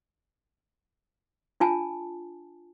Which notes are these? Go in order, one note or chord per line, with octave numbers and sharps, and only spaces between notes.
D4 F4 G#5 A5